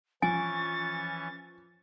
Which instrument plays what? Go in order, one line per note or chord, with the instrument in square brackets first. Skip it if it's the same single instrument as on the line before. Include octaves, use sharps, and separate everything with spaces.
[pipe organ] E3 C#4 C#6 [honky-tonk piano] F3 [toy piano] G#5 [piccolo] A6